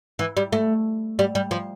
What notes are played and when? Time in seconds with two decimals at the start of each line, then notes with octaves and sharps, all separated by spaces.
0.19 E3
0.37 G3
0.53 A3
1.19 G3
1.35 G3
1.51 F3